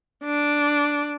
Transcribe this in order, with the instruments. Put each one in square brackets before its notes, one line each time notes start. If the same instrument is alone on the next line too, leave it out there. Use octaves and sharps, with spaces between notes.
[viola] D4